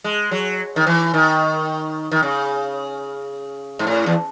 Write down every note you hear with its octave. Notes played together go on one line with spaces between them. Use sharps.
G#3
F#3
D#3
E3
D#3
D#3
C#3
G#2
A2
E2